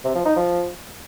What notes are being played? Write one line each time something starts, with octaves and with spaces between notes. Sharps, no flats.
C3
F3
D#4
F3